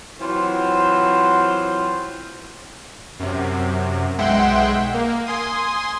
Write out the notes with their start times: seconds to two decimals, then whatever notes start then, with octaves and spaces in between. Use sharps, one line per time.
0.20 E3 F#3 C4 F4 F#4 C5
3.20 F#2 C3
4.18 B1 G#3 E5 F#5 G5 C6
4.94 A#3
5.27 G#5 C6 D#6